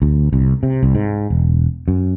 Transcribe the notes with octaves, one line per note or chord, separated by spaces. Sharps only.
D2
C2
C3
C2
G#2
E1
F#2